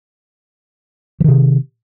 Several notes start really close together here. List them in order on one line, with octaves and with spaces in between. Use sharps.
E3 D#3 C3